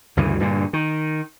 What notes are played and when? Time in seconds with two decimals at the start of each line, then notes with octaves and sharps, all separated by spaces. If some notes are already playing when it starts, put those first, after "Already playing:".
0.17 D2 G2 C#3 E3
0.40 G2 A#2 D3
0.73 D#3